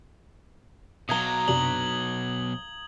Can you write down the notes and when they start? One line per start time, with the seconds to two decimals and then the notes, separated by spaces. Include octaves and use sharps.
1.09 B2 F#3 F5 A#5 D#6 G#6 G7
1.48 F#2 C3 D4 F#7